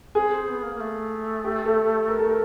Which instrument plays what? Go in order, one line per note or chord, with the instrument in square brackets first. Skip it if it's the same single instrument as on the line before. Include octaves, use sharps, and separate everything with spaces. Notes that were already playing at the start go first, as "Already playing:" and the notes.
[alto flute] C4 [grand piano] G#4
[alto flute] C4
B3
A#3
A#3
A3
[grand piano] G4
A4
A#4
A4
A#4